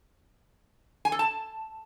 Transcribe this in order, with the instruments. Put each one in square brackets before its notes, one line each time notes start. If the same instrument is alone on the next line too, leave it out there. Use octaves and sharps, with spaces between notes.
[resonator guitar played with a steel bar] G#5
A4
A5